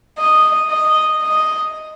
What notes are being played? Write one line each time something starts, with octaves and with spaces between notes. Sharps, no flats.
D#5
D#5
D#5